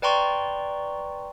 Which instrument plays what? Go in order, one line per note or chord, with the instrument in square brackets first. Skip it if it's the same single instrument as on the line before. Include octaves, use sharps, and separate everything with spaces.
[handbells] B4 D5 G5 A#5 C6 C#6